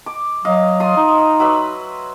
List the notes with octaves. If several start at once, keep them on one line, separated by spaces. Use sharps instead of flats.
D6
F#3 D#5 F5
F4 C6 D#6
D#4
F#3 B4 E5